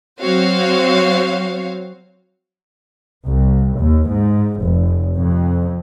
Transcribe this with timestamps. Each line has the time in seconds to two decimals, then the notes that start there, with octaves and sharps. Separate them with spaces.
0.20 F#3 C4 F#4 C5 C#5 F5
3.26 C2
3.78 D#2
4.09 G#2
4.62 F1
5.16 F2